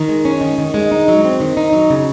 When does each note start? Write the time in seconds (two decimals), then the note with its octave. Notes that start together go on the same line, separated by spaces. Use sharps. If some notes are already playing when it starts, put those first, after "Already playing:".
Already playing: D#3
0.09 G#3
0.25 C#4
0.41 D#3
0.58 D#3
0.74 G#3
0.91 D#4
1.08 F#3
1.24 C4
1.40 D#3
1.57 D#4
1.73 F#3
1.90 C#3